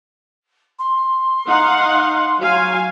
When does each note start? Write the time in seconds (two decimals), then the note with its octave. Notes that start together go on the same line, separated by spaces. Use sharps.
0.79 C6
1.46 D#4 F5 F#5
2.38 F#3 F5 G#5